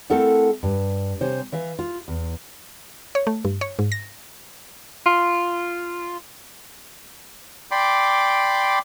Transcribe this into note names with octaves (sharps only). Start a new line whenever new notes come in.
A3 C4 E4 A4 A#4 F#5
G2
C3 C5 C#5 G#5
E3 E5 F5
F4
E2
C#5
A3
G2
C#5
G#2
A#6
F4
D5 G5 B5 C6 D6